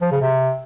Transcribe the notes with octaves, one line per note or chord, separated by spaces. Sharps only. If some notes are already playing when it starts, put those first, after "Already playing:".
F3
C#3
C3